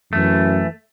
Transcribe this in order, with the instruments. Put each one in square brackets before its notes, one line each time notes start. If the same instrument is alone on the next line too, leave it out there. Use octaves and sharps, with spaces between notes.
[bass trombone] F#2 [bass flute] E3 [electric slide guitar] A3